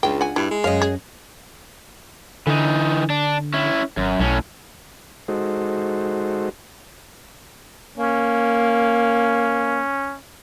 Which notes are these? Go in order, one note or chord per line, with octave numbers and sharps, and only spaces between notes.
C#2 D4 F4 G#4 G5
F#5 G#5
G2 E4
G#3
F#2 C#5 D#5 F5
G#4
D3 E3 D#4
D4
C#4 E4
G#1 F#2
B1 A2 C#4
G#3 D#4 F#4 A4 C5
A#3 C#4